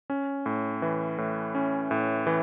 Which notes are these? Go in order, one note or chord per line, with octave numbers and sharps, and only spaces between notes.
C#4
A2
E3
A2
C#4
A2
E3